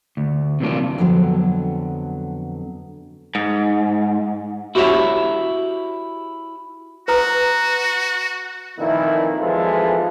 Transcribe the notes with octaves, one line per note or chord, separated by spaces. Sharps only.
D2
C3 E3 F#3 A#3 D4 F4
F2 D3 F#3 B3
G#2
E4 F#4 G4 A#4 C#5 E5
F#4 B4 A#5 D#6
F2 A#2 D#3 E3 A3 E4
G#1 E3 F3 G#3 F4 A4